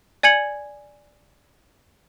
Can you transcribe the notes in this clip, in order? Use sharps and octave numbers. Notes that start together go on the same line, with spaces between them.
D5 G#5 G#6 C#7 F#7